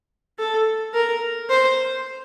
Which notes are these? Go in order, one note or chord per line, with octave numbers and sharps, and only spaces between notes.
A4
A#4
C5